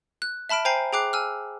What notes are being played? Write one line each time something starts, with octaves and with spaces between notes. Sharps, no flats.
F#6
E5 A5 B5 F6 D7
C5 G5 G#5 A#5 G6 C7
G#4 G5 D6 F#6 C7
G#5 E6 F6